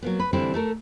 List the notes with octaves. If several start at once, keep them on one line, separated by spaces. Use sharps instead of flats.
F#3 A#3 B3
B4
D3 E3 G3 C4 D4 E4
A3 A4 A#4